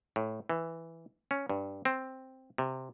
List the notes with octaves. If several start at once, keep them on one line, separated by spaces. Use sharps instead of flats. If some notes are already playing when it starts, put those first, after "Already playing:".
A2
E3
C#4
G2
C4
C3